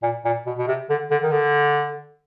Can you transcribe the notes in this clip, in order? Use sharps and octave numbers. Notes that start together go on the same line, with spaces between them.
A#2
A#2
B2
B2
C3
D3
D3
D#3
D3